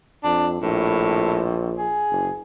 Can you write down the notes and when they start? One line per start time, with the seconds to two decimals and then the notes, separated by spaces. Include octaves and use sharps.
0.24 F2 D4
0.62 A#1 A2
1.78 G#4
2.11 F#1